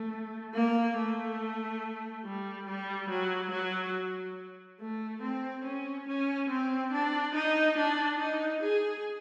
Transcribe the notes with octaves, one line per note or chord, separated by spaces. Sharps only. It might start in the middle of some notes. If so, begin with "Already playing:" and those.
Already playing: A3
A#3
A3
G3
G3
F#3
F#3
A3
C4
C#4
C#4
C4
D4
D#4
D4
D#4
G#4